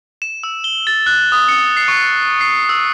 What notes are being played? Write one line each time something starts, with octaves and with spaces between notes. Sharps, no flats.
E7
E6
G7
A6
F#6
D#6
C#7
C7
C#6
C7
E6